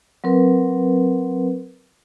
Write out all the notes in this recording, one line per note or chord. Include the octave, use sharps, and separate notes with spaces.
F#3 C4 A#4 B4